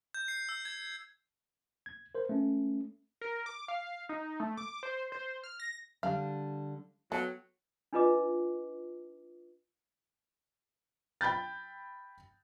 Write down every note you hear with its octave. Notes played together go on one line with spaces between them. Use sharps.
G6
C7
E6
G#6
G#6
A#4 C5
A3 C#4
A#4
D6
F5
D#4
A3
D6
C5
C5
F6
A#6
D3 G3 D4 F5
F#3 B3 A4 G5
D4 D#4 F4 B4 D#5 D6
G5 B5 G6 A6